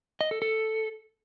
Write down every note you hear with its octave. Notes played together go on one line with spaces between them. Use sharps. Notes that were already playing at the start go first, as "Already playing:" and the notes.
D#5
A4
A4